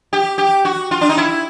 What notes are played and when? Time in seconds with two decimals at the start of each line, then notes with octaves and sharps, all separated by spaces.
0.13 G4
0.38 G4
0.65 F#4
0.91 F4
1.01 D4
1.09 D#4
1.18 E4